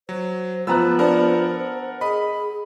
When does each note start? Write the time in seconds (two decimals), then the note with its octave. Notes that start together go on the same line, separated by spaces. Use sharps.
0.09 F#3 C5
0.67 F3 B3 B4 A5 A#5 E6 F#6
0.99 B3 D4 A#4 F#5 A5
2.01 G#4 D#5 B5